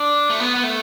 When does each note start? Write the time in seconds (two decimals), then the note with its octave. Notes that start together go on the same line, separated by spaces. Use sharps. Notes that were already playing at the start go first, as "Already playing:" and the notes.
Already playing: D4
0.30 A3
0.40 B3
0.55 B3
0.63 A3